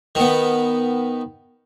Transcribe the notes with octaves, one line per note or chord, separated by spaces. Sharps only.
D#3 B3